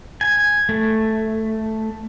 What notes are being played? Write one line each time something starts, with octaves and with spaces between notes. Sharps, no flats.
G#5
A3